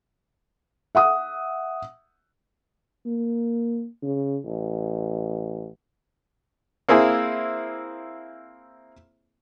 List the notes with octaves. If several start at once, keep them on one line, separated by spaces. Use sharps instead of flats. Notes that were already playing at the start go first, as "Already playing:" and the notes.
E5 F#5 D#6
A#3
C#3
A1
A#3 C4 E4 G#4